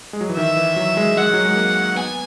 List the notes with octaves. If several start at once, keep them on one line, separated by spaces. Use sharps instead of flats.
G#3
F#3
E3
D#3 E5
E3
F#3
G#3
G#3 F#5
F#3
G#3
A#3
B3 G#5